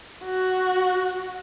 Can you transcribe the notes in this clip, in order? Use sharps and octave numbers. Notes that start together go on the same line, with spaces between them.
F#4